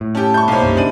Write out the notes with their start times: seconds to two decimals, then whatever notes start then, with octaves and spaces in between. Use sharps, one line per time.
0.01 A2
0.15 C#4 G4 A4 A5
0.34 G3 E4 C#6 G6
0.48 B1 G#2 C3 A#3 C#5
0.61 C2 F#2 A#3 C6
0.76 C#3 D4 E4 G#4 D#5 D#7